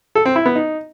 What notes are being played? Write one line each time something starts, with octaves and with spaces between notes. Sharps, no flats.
A4
C4
E4
B3
D#4